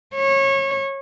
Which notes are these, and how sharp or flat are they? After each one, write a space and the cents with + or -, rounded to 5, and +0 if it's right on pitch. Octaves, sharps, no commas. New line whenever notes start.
C#5 -25